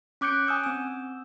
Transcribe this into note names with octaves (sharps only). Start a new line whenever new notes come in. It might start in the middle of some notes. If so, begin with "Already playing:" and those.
C#4 D6 F#6 G6 C#7 D7
G#5 D#6 E6 G6
C4 E6